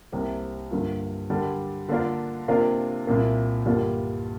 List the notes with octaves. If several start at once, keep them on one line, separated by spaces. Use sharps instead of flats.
C2 C3 A#3 G4 A#4
G2 D3 A#3 F4
D3 G3 D4 A#4
D3 A#3 D4 F4 A#4
C3 A#3 D4 F4 A#4
C2 A#2 A#3
G2 D3 G3 A#3 F4